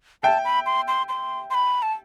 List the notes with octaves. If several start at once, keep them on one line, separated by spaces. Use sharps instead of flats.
E5 G5 A5
B5
C6
C6
C6
C6
B5
A5